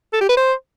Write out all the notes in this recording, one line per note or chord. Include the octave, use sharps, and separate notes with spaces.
A4
G4
B4
C5